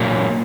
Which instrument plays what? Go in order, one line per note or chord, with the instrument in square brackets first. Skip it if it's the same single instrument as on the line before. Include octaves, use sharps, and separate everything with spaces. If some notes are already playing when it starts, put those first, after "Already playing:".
Already playing: [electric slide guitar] A#2 F#3 A#3